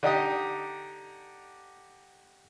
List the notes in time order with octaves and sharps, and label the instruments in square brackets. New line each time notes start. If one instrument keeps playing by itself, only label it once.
[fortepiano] D3 D#4 G4 D#6